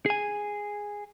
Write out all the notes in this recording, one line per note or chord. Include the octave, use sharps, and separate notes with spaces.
G#4 G#5